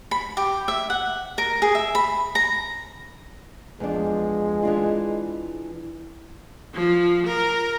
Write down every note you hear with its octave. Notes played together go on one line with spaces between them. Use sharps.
B5
G4
E5
F#5
A#4
G#4
E5
B5
A#5
E2 F3 G#3 D4
E3 D4 F4
F3
A#4